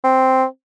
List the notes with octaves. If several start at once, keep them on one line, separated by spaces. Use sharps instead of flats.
C4